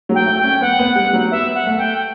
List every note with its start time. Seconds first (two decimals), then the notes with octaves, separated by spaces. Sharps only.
0.09 F#3
0.14 G5
0.26 A3
0.38 G5
0.43 C#4
0.61 B3 F#5
0.79 B3
0.95 G3
1.13 F#3
1.31 B3 E5
1.54 F#5
1.66 A3
1.78 G5